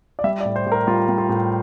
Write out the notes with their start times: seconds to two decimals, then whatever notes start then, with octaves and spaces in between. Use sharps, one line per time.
0.19 D5
0.24 G3 E5
0.41 D5
0.45 A2
0.56 C5
0.66 A2
0.72 A#4
0.87 G3 F4
1.09 G3
1.18 F4
1.29 A2